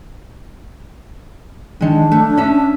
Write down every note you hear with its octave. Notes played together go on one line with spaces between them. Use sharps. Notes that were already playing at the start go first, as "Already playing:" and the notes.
D#3 G#3 D4
A3
C#4 E5